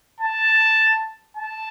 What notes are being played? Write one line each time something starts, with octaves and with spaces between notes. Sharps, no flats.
A5
A5